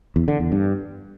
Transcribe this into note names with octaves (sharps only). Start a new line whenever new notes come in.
E2
D3
E2
G2